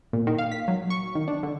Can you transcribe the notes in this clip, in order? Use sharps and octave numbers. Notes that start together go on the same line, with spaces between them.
A#2
D#3
F5
B6
F#3
C#6
D#3
D4
D3